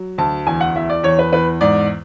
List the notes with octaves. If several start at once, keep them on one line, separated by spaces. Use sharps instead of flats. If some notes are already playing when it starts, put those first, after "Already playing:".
Already playing: F#3
D2 A5
E2 G#5
F#5
E2 E5
D5
E2 C#5
B4
E2 B4
G#2 D5